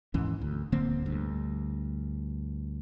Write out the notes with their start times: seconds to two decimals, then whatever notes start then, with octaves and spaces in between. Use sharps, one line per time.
0.14 D#2 G#2 E3 C#4
0.42 D2
0.72 D1 D3 A#3 C4
1.06 D2 G2